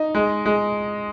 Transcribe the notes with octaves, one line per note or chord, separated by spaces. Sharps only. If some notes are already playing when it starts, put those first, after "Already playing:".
Already playing: D#4
G#3
G#3